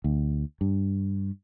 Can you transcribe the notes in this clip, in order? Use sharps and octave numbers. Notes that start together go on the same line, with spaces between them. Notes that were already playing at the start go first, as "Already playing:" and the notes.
D2
G2